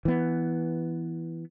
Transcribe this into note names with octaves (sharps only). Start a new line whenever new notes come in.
E3 B3